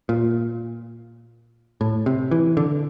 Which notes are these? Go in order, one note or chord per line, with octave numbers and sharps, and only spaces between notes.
A#2
A2
C3
E3
D3